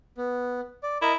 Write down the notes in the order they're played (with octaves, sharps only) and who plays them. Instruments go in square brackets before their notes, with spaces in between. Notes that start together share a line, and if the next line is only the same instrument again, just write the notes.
[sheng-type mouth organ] B3
D5
[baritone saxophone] E4 [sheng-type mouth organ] A#4 D#5